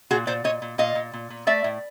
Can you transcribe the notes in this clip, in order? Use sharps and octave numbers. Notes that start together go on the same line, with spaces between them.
A#2 F#4 G#4
A#2 C5 D5
A#2 C#5 D#5
A#2
A#2 D#5 F5
A#2
A#2
A#2
A3 D5 E5
A2